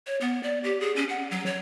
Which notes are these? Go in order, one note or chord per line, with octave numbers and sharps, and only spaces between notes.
C#5
B3
D5
G4
G#4
C#4
F#5
F#3
C#5